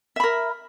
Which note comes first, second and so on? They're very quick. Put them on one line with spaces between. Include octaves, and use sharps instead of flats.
E5 B5 A#4